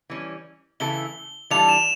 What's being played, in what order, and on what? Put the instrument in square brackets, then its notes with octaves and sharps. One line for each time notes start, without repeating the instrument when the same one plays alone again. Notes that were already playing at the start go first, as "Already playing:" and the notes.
[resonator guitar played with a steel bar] E3 G3 C#4
[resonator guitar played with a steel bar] C#3 E3 A3 E4 A4 [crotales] G7
[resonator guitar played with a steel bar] E3 G3 D4 F4 A4 [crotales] F7
[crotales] E7